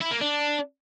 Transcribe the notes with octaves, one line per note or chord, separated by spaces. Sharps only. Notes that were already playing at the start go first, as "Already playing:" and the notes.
E4
A#3
D4